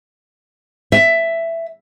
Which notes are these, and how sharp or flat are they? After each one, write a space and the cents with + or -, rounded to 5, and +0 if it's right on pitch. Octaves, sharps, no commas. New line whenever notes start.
E5 +10